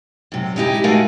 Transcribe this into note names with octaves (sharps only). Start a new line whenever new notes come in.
F#2 C3
G#3 A3 D#4 E4 F#4 G4
G#3 A3 F#4 A#4 F5 G#5